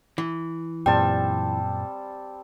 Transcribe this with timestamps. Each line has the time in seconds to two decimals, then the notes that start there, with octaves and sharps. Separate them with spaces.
0.18 E3
0.86 F#2 A#2 G3 C4 G5 A5